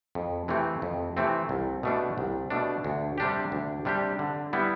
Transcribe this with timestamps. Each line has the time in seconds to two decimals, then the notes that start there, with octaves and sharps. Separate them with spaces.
0.15 F2
0.48 C3 E3 A3 C4
0.82 F2
1.17 C3 E3 A3 C4
1.49 C2
1.83 B2 A3 D4
2.18 C2
2.50 B2 A3 D4
2.84 D2
3.18 C3 G3 D4 G4
3.52 D2
3.85 C3 G3 D4 G4
4.19 D3
4.53 G3 B3 E4